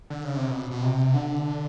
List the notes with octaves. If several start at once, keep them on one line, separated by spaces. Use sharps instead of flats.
D3
C#3
C3
B2
B2
C3
D3